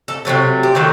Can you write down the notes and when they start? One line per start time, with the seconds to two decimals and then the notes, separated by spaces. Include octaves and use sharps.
0.08 A4
0.25 C3 D#3 F#3 A3
0.63 G4
0.75 C3 D#3 F#3 A3 A4